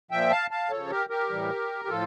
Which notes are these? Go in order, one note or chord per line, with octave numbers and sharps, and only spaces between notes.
A#2 F3 E5 G5
F5 A5
F5 A5
C#3 F3 A4 C#5
G4 A#4
G4 A#4
A2 E3 G3
G4
A2 F3 F4 A4